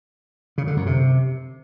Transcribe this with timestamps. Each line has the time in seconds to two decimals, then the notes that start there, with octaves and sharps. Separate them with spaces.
0.58 C#3
0.67 D3
0.77 F#2
0.86 C3